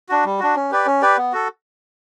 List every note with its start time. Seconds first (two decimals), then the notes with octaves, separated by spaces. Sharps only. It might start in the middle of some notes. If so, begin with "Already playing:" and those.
0.09 D4 F#4
0.25 G3
0.40 D4 F#4
0.56 C#4
0.71 G4 B4 D5
0.87 C#4
1.02 G4 B4 D5
1.17 B3
1.33 F#4 A4